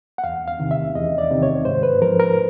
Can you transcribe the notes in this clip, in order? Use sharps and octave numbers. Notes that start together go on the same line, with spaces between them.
F#5
E2 F5
F5
C3 D#3
E5
E2 D#5
D5
C3 D#3
C#5
G#2 C5
B4
F3 A#4
A#4